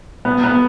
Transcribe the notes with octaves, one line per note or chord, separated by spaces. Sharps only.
B3
B3